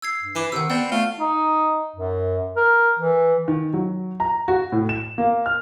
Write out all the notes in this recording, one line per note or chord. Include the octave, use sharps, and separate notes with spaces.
E6 G#6 C7
G2
E3 B5 D6 C7
C3 D#3 F#5 E6
B3 C4 D5 F#5
A3 F4
D#4
F#2
A#4
E3
D#3
F#3
A#5
F#4
A2
E7
A#3
F6